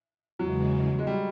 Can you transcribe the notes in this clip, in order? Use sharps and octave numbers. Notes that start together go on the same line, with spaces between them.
E2 C#3 E3 F#3 G#3
G#3
G3